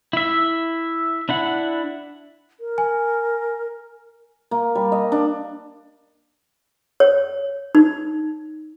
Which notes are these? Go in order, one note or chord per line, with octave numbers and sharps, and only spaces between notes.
E4 E5
D4 E4 F#5
A#4
G#5
A#3
G3
D#5
D4
C#5
D#4